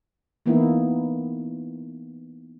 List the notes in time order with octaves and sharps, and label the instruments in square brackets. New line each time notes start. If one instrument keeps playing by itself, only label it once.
[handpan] E3 A#3 B3 D#4 E4